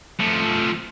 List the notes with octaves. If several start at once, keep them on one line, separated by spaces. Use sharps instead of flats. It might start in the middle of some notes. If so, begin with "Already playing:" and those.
F3 A3